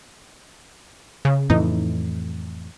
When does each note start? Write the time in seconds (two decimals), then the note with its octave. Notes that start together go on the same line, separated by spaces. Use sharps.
1.25 C#3
1.50 F2 A2 E3 D#4